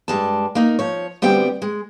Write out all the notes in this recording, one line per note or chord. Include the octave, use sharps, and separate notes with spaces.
G2 G3 G#3 A5
A#3 D#4
F3 C#5
D2 G3 B3 C4 G5
G#3